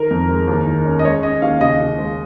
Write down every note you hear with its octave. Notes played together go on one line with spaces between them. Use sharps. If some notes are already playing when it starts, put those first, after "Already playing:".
Already playing: D#3 A#4
F2
G#3
D#2
D#3
C#4
D#5
G#3 C#5
C#4 D#5
D#2 F5
C#3 D#5
C#3
G#3